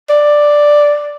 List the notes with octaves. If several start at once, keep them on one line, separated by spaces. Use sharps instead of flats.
D5